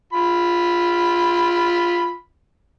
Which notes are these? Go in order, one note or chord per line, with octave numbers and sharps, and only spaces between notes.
F4 B5